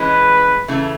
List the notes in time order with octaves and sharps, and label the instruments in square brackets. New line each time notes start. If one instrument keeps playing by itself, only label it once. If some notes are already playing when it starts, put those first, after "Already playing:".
Already playing: [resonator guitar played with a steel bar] E3 G#3 C#4 [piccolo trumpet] B4
[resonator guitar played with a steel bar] C#3 E3 A3